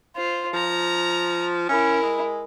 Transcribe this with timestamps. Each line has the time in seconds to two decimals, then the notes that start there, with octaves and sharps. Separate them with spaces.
0.16 F4 C5
0.54 F3 A#5
1.69 C#4 E4 A#4
2.03 G#3